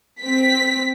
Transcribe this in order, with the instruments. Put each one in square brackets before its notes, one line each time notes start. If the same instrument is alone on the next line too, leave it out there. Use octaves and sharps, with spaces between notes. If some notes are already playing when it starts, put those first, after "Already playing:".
[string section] C4 B6